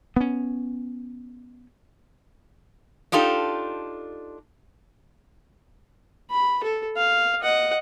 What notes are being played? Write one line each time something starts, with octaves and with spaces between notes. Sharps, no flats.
B3 C#4
D4 D#4 F4 G4 A4
B5
A4
F5
D#5 F#5